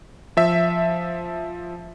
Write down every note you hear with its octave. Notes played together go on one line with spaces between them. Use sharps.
F3 E5